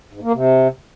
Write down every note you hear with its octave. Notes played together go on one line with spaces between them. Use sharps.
G#2
A#3
C3